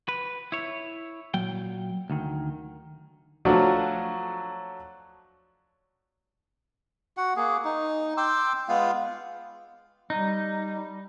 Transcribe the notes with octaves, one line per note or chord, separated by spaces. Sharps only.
B4
E4 C#5
A#2 F#3 G5
D2 D#3
F3 F#3 A3 D4 F#4
F#4 F#5
A#3 G#4
D#4
G5 C6 D6 E6
G#3 B3 F4 F5
G3 D#4